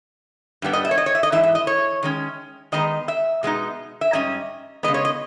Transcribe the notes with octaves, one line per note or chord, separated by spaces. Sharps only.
G2 G3 B3
D#5
E5
C#5
D#5
C#5
E5
D#5
G#2 E3 E5
E5
D#5
C#5
D#3 G#3 C#4
D#3 G#3 B3 D#4 D#5
E5
B2 G#3 B3 D#4
E5
G#2 G3 C#4 D#5
C#3 G#3 B3 D#5
C#5
D#5